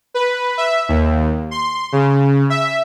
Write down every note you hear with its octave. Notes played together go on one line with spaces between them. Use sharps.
B4
E5
D#2
C6
C#3
E5